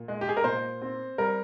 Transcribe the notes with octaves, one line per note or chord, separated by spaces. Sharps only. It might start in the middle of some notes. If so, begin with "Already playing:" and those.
Already playing: A#2
G#3
G4
G#4
A#4
A#2 C5
C4
G3 A#4